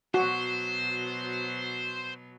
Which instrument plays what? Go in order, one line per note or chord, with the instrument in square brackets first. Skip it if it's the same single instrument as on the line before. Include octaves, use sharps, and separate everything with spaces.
[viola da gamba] B2 F#3 [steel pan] F#4 [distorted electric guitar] C5